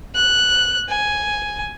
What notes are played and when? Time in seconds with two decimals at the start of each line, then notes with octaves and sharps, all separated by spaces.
0.15 F#6
0.89 G#5